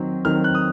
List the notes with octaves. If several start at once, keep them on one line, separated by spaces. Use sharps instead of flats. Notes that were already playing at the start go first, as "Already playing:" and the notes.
Already playing: D#3 F#3 C4
D#3 F#3 C4 F6
F#6
D#6